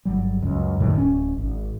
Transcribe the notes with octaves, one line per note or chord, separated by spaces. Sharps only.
G1 F#3 G3
C#2 F#2
F#2 A2 D#3 G3
D1 C#4
G#1